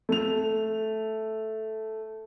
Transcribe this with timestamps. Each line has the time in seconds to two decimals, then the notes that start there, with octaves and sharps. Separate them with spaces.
0.09 A3 F7